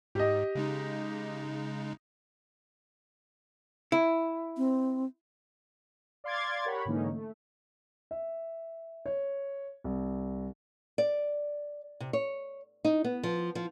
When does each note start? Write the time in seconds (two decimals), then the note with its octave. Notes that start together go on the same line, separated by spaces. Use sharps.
0.15 G#2 G4 D#5
0.55 C#3 G#3 D#4
3.92 E4
4.57 C4
6.24 D5 F5 C6 D6 G#6 A6
6.65 G4 A#4 C#5 F#5 B5
6.85 G#2 D3 E3 A#3 C#4 D#4
7.13 A3
8.11 E5
9.06 C#5
9.84 C2
10.98 D5
12.00 C3
12.13 C#5
12.84 D#4
13.04 B3
13.23 F3
13.55 F3